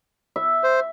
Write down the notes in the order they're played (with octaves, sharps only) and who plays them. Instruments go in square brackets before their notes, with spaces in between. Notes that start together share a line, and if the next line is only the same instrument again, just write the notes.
[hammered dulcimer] E5
[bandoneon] C5